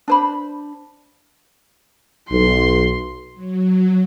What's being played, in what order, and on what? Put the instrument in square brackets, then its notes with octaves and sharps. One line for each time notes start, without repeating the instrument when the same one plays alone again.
[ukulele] D4 C5 B5
[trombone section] B1 [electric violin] C6
[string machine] F#3